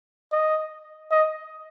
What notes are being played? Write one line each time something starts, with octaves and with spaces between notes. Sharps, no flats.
D#5
D#5